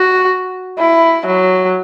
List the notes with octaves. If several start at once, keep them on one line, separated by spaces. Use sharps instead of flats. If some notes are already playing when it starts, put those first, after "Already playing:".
Already playing: F#4
E4
F#3